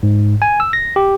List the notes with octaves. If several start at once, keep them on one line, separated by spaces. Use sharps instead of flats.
G#2
G#5
E6
A#6
G4